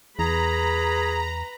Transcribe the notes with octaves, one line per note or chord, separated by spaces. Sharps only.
E2 G#4 B4 A#5 B5